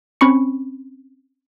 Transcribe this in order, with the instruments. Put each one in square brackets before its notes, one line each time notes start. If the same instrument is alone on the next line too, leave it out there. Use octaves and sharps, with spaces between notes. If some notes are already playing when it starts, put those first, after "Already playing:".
[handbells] C4 C#4 B5 C#6 C#7